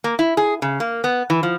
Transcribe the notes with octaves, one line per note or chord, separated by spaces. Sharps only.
A#3
E4
G#4
C#3
A#3
B3
E3
F3